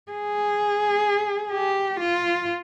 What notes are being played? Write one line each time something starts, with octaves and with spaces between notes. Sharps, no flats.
G#4
G4
F4